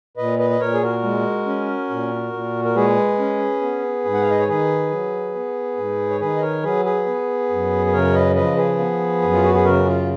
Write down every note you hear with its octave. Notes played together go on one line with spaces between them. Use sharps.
A#2 B4 D#5
B4 D#5
D#5
A#2 A#4 C#5
G#4
F#4 A#4
G#3
C#4
A#2
A#2
A#4
G#3 G#4 B4
C#4
B3
G#2
F#5
F5
D#5
C#5
D#3 G#4 B4
F#3
B3
G#2
C#5
D#3 G#4 B4
D#5
A#4 C#5
F#3 G#4 B4
G#4 B4
B3
F#2
B4
C#3 A#4 C#5
B4 D#5
F3 B4 D#5
G#4 B4
B3
F#2
F4
F#4
G#4
C#3 F#4 A#4
F4